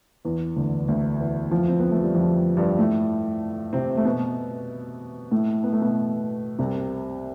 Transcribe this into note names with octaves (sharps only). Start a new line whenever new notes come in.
E2 E3
D2 D3
D2 D3
E2 E3
F2 F3
C4
B3
A3
G3
F2 F3
G2 G3
A2 A3
C3 C4
A3
B2 B3
A2 A3
B3
A3
B2 B3
C2 C3